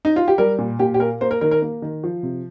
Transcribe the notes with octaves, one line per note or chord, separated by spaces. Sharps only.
D#4
F4
G4
G3 A#4
A#2
A#2 G4
G4
A#3 A#4
A#3 C5
A#4
D#3 A#4
A#4
A#3
D#3
F3
C3